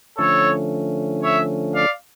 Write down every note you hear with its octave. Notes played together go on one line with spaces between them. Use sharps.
D3 F3 A3 C#4 A4 C#5
C#5 E5
D5 F5